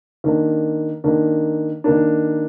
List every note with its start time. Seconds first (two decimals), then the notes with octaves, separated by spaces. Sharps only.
0.24 D#3 A#3 D4
1.04 D#3 A#3 D4
1.84 D#3 A#3 D4